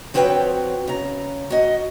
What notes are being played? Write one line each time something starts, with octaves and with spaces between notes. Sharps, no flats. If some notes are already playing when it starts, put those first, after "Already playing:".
F3 C4 F#4 B4 C#5 G5
C#3 A#5
F#4 D#5